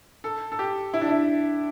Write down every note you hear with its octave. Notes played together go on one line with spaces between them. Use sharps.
A4
A4
G4
E4
D4
E4